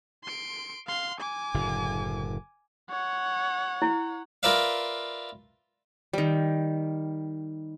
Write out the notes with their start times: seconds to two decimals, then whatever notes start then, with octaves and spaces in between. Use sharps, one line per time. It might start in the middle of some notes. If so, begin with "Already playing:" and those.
0.24 C6 D7
0.87 F5 C6
1.20 G#5 D6
1.54 F#1 A2 D3
2.90 C#5 F#5
3.82 E4
4.43 F4 A#4 B4 D5 E5 F5
6.13 D#3 G3